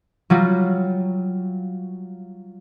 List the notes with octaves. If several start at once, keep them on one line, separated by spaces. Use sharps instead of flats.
F#3 G3 F4 F#4